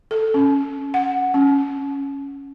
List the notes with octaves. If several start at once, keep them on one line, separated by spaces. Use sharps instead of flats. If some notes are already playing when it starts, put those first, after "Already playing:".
A4
C#4
F#5
C#4